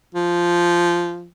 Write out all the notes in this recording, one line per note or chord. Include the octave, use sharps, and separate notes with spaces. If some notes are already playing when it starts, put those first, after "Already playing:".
F3